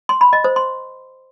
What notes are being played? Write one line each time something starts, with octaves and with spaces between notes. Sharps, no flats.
C6
B5
D#5
C5
C6